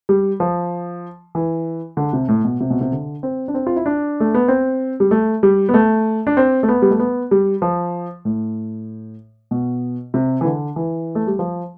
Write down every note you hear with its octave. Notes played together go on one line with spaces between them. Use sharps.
G3
F3
E3
D3
C3
A2
B2
C3
B2
C3
D3
C4
D4
C4
F4
E4
D4
A3
B3
C4
G3
A3
G3
B3
A3
D4
C4
A3
B3
G3
A3
B3
G3
F3
A2
B2
C3
E3
D3
E3
A3
G3
F3